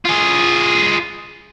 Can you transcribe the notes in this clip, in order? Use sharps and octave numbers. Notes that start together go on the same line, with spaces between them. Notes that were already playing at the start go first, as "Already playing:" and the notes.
F4 G#4